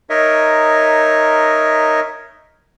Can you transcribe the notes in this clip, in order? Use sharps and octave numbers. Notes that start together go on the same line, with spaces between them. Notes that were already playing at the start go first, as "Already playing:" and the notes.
D#4 A#4 C#5 D#5 E5